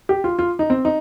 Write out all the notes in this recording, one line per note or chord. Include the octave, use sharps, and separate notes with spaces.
G4
F4
F4
D#4
C4
D#4